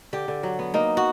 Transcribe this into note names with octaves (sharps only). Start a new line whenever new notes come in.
D3 G4
D3
F#3
B3
A#3 D#4
F#4